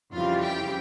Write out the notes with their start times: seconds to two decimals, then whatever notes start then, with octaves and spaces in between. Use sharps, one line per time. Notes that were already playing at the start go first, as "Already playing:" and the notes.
0.12 F2 C#3 E3 G3 F4 F5
0.41 G4 G5